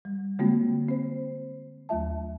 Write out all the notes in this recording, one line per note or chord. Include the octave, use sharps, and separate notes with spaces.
G3
D3 G#3 A#3 C4 F4 F#4
C4 C5
D#2 F#3 A3 F4 E5 A5